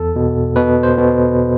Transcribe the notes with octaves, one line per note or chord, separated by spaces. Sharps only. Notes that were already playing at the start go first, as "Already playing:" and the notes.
Already playing: E2 A4
B2
B2 B4
C5
B2